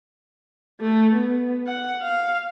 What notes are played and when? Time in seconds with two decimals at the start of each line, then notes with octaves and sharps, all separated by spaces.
0.80 A3
1.15 B3
1.67 F#5
2.01 F5